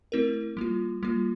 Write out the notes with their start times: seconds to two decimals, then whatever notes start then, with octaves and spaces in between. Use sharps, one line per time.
0.12 A3 C4 E4 A#4
0.57 G3 A#3 F4
1.03 G3 A#3 F4